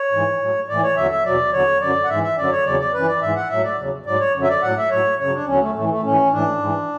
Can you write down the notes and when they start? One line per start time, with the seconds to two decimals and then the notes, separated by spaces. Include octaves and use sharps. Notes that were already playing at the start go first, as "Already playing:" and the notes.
Already playing: C#5
0.12 G#2 E3
0.41 A2 F#3
0.68 A2 E3 D5
0.83 C#5
0.96 E2 D3 F#3 E5
1.11 E5
1.25 E2 B2 F#3 D5
1.53 E2 D3 F#3 C#5
1.81 F#2 D3 F#3 D5
2.04 F#5
2.09 G#2 E3 E5
2.23 E5
2.37 F#2 D3 F#3 D5
2.52 C#5
2.65 E2 C#3 F#3 D5
2.79 D5
2.93 F#2 E3 B4
3.08 D5
3.21 G#2 E3 E5
3.36 F#5
3.50 A2 F#3 E5
3.64 D5
3.78 E2 C#3 F#3
4.06 G#2 F#3 D5
4.20 C#5
4.34 F#2 D3 F#3
4.43 E5
4.49 D5
4.62 A2 F#3 F#5
4.77 E5
4.90 A2 F#3 C#5
5.19 F#2 C#3 F#3 C#5
5.33 D4
5.47 E2 D3 F#3 C#4
5.61 A3
5.75 A2 E3 A3
5.89 A3
6.03 A2 E3 C#4
6.31 A2 E3 D4
6.59 G#2 E3